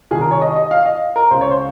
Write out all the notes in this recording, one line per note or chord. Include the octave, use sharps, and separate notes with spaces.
C2 C3 D#3 G#4
A#4
C#5
D#5
D#5
F5
D#5
A#4
C#2 C#3 C5
C#5
C5